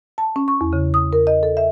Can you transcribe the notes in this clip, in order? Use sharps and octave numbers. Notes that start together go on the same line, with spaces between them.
A5
C#4
C#6
E2
C#3
D#6
A#4
D#5
A4
E5